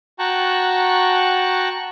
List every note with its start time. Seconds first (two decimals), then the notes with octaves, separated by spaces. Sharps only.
0.19 F#4 G5 A5 A#5 C#6 F#6